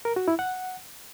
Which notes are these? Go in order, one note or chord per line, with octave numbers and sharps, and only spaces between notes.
A#4
F#4
E4
F#5